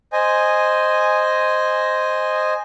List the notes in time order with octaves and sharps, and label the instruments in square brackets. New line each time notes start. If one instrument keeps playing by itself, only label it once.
[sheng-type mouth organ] C5 D#5 G#5